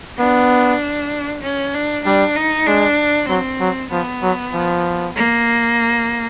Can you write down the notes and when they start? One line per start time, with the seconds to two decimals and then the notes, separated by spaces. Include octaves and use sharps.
0.19 B3 D4
1.43 C#4
1.74 D4
2.05 G3 D4
2.36 D#4
2.67 G#3 D4
3.29 F#3 C4
3.60 F#3
3.91 F3 B3
4.23 F#3
4.54 F3
5.16 A#3